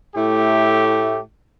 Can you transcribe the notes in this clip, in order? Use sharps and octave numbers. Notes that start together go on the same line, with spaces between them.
A2 A3 E4 G4